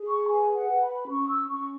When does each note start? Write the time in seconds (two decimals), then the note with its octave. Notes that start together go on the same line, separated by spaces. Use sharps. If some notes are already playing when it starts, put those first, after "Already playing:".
Already playing: G#4
0.08 C#6
0.28 B4 G#5
0.55 F#5
0.69 B4 G#5
0.82 B5
1.08 C#4 C#6
1.29 E6
1.48 C#4 C#6